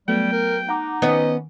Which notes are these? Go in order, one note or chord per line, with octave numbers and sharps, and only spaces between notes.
F#3 G3 A3 B3 G5
A#4
D#4 F#5 A#5 D6
D#3 B3 C#4 D#5